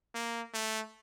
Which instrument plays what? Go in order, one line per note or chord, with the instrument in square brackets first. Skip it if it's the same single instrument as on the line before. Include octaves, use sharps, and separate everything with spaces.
[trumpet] A#3
A3